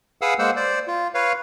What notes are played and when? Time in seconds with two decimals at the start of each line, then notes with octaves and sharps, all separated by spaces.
0.22 G#4 B4 F5 F#5 D#6 E6
0.39 G#3 A#3 C5 F#5 E6
0.56 C5 D5
0.87 F4
1.14 B4 C#5 F5